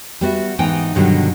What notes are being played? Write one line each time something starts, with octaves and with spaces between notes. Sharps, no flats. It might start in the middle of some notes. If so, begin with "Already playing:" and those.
G3 B3 F#4 E5
G#2 E3 B3 D#4 G5 G#5
G2 B2 D3 D#3 F#3 G3